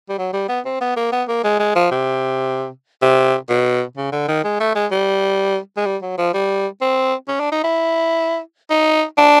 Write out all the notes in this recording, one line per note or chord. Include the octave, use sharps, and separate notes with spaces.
G3
F#3
G3
B3
C4
B3
A#3
B3
A#3
G#3
G#3
F3
C3
C3
B2
C#3
D3
D#3
G#3
A3
G#3
G3
G#3
G3
F#3
F3
G3
C4
C#4
D4
D#4
E4
D#4
D4